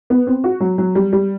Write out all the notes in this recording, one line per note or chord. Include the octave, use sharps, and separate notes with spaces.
B3
C4
F#4
F#3
F#3
G3
G3